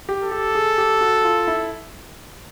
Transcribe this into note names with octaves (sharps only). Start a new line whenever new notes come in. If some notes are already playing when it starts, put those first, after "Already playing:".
G4
A4
G4
G#4
G4
F#4
F4
E4